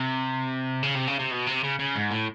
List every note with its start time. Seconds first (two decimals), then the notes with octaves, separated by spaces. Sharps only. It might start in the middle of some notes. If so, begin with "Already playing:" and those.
Already playing: C3
0.83 C#3
0.95 C3
1.07 C#3
1.19 C3
1.31 B2
1.46 C3
1.63 C#3
1.79 C#3
1.95 G#2
2.11 A2